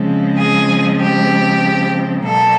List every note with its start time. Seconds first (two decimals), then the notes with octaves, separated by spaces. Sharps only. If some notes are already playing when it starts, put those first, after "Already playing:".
Already playing: C#3 F3 G#3 C4
0.37 G#4
1.00 G4
2.25 B2 F#3 A#3 A4